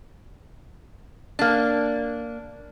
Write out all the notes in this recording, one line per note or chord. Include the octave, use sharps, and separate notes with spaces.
A#3 D4